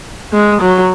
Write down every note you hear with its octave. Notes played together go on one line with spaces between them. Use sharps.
G#3
F#3